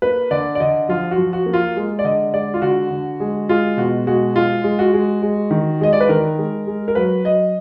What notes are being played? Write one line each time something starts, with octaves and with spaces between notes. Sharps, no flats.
A#3 B4
D3 D5
D5
D3 D#5
F3 F4
F#4
F3
F#4
A#3
F4
G#3
D5
D3 D#5
G#3 D5
F4
D3 F#4
D3
G#3
G#3 F4
B2 F#4
G#3 F#4
G#3 F4
G#3
F#4
G#3
G#3
D#3
G#3 D#5
D5
B4
D#3 A#4
G#3
G#3
A#4
F#3 B4
F#3 D#5